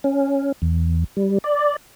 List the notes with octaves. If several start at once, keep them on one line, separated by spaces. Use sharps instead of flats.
C#4
E2
G3
D5